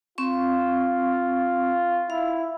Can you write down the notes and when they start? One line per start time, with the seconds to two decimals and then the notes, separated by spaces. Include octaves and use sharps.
0.18 C4 F4 C#6
2.10 E4 F5